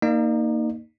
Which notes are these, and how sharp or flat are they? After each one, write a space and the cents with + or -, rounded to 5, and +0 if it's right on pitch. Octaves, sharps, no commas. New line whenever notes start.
A#3 -10 D#4 +0 D5 +45